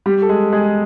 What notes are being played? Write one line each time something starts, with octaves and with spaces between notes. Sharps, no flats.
G3 G4
A4
G#3 G#4
G#3 G#4